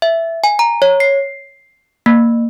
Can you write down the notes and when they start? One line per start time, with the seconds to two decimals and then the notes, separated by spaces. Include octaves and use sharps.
0.02 E5
0.44 G#5
0.59 A#5
0.82 C#5
1.00 C7
2.06 A#3